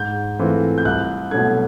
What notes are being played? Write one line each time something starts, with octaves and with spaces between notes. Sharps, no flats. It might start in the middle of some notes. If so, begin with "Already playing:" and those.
Already playing: G#2 G6
E3 A3 C4 F4
G6
C2 F#6
B2 F#3 A3 G#6